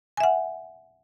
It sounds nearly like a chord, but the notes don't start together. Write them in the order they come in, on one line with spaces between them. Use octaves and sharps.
G#5 E5 F#5